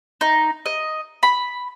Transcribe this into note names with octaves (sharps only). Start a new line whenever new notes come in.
D#4
D#5
B5